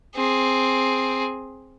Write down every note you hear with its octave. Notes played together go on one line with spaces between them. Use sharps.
C4 G#4